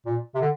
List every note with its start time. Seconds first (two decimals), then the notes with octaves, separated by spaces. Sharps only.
0.06 A#2
0.35 C3
0.41 D3